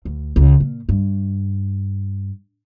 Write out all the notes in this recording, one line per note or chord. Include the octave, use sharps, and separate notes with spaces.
D2
C#2
A#2
G2